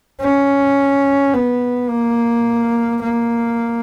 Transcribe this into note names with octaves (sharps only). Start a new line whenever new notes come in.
C#4
B3
A#3
A#3